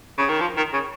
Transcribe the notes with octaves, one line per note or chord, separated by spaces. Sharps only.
C#3
D#3
F3
D#3
C#3